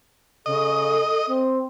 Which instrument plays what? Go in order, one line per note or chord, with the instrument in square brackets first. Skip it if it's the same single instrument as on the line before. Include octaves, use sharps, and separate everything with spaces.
[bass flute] C#3 [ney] A4 [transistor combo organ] D#5
[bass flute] C4